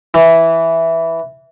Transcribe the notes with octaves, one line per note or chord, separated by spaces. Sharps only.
E3